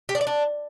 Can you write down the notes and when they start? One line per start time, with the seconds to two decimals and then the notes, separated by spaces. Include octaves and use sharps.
0.09 G4
0.15 D4
0.21 D5
0.27 D4